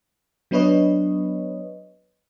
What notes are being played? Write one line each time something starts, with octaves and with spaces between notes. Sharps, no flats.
F#3 B3 D4 B4 C#5 D#5